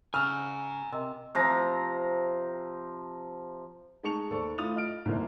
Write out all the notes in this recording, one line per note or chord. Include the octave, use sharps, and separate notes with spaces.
C#3 G#5 A#5 E6 F6
C3 A#4 D#5 E6
C3 F3 A#5
G#3 D#4 A5 C#6 C#7 F7
D#2 A4 C5 D5 C#6
A3 E4 F4 D#6 A6 F7
D#5 F6 D7
G1 C2 F2 F3 A#3